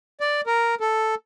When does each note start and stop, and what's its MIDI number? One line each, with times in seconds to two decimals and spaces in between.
0.20 0.41 74
0.47 0.75 70
0.80 1.15 69